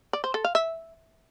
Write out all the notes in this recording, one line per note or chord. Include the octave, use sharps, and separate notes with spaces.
D5
C5
A4
F5
E5